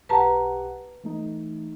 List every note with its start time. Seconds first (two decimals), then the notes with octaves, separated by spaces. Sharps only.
0.09 B1 G4 B4 F#5 A5 A#5
1.03 E3 A3 D#4